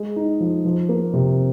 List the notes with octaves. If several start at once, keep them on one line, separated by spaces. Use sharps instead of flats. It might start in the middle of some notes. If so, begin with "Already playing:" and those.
Already playing: G#3
D#4
F3
F3
A#3
C3